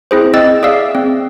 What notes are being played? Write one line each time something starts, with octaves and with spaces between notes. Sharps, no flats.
C4 E4 G#4 C5
C4 D#5 E6 A6
G#4 D5 E5 F5 E6
C4